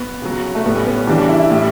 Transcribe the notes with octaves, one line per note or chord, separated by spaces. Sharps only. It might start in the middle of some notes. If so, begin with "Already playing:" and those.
Already playing: B3
C#3 F#3
A3
A2 G3 B3
C#4
B3
C#4
C#3 E3 G3 D4
D4
E4
E4
A2 G3